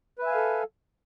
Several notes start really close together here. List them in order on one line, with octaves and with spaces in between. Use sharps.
B4 E5 G#5 F5 A4